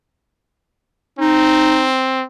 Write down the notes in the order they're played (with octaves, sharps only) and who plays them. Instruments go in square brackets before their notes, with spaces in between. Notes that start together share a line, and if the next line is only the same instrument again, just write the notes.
[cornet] C4 [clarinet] D#4